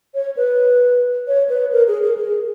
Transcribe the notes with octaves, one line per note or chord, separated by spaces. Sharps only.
C#5
B4
C#5
B4
A#4
G#4
A#4
G#4